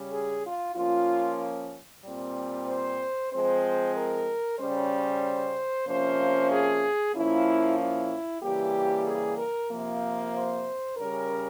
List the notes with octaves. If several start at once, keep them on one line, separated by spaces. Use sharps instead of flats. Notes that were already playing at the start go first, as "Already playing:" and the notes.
Already playing: C#3 G3 C#4
G#4
F4
F3 A#3 C#4 F4
A#2 G3 C4
C5
F3 G#3 C4 C5
A#4
C#3 G3 C#4 C5
C3 F3 A#3 C#4 C5
G#4
A#2 F3 A#3 C#4 E4
E4
C#3 E3 G3 A#3 G4
G#4
A#4
C3 F3 A#3
C5
C#3 G3 C#4 A#4